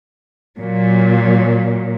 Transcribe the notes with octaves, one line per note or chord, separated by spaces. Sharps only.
A#2 F#3